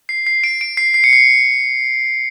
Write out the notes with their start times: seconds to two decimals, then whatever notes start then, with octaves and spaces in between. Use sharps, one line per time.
0.09 C7
0.27 C7
0.44 D7
0.61 D7
0.77 C7
0.94 C7
1.04 C#7
1.13 C7